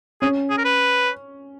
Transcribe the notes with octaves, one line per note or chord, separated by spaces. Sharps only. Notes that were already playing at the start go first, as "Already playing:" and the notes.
C#4 G#4
G#4
A#4
B4